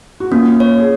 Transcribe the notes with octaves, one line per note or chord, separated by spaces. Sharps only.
F#4
A#3 C#4 F4
C#5
G#4